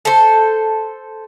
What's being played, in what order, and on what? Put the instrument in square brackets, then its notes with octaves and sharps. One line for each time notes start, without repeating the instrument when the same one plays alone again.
[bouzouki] A4 C5